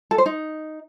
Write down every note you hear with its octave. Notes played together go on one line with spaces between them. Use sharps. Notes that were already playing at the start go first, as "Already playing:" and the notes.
A4
C5
D#4